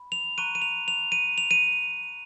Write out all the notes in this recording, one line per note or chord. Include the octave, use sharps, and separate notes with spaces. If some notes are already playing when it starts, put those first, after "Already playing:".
Already playing: B5
F7
A#5 C#6 F#6 D#7
D#7
F7
F7
D#7
F7
D#7